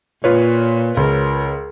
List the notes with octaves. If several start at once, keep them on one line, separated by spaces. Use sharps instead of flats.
A#2 F4 B4 C#5
C#2 A#4